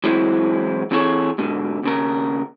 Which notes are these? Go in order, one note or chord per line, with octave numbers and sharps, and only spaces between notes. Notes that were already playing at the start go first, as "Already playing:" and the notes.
E3 F#3 G#3 C4 E4
E3 C4 E4 G#4 A4 C#5
G#2 B2 D3
D#2 C#3 A#4